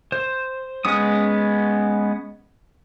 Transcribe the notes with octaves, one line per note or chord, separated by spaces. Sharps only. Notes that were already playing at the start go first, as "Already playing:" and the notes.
C5
G#3 B3 C#4 D#6